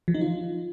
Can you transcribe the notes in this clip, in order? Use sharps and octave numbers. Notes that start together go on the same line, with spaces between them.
F3
D#4
F4